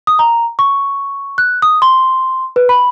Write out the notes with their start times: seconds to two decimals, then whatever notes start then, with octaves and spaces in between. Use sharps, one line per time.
0.07 D#6
0.19 A#5
0.59 C#6
1.38 F#6
1.62 D#6
1.82 C6
2.56 B4
2.69 B5